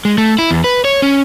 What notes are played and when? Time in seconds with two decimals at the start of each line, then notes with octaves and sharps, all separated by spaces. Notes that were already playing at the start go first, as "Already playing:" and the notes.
0.05 G#3
0.18 A3
0.39 E4
0.51 E2
0.64 B4
0.85 C#5
1.02 C#4